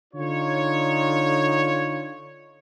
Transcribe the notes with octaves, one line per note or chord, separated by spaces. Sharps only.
D3 D#4 F4 C#5